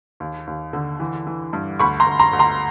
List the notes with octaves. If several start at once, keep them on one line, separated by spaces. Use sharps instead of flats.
D#2
D#2
D3
E3
E3
G2
D2 B5 C#6
A#5 C6
D2
A#5 C6
D2
A#5 C6